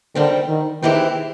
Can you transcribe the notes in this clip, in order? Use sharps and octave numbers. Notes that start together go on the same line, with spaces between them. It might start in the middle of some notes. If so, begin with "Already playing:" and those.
D3 D#3 G3 C4
D#3
D#3 E3 G#3 C4 E4 G4